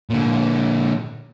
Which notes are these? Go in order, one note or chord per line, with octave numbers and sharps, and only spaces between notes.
A#2 D3